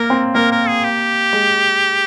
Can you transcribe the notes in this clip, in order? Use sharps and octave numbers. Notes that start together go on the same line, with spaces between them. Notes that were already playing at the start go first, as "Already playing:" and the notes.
Already playing: A#3 A#4
C4
A#3 A#4
A#4
G#4
G4
G#3